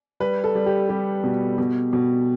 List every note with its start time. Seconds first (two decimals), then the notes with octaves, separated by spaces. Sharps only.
0.20 G3 B4
0.44 A4
0.55 G3
0.66 G4
0.89 G3 G4
1.24 B2
1.58 B2
1.93 B2